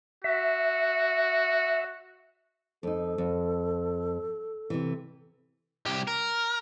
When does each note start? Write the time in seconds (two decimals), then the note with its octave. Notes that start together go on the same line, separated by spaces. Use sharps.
0.24 F#4 E5
2.83 F2 D#4 A4
3.18 F2
4.70 C3 E3
5.86 C2 G4
6.07 A#4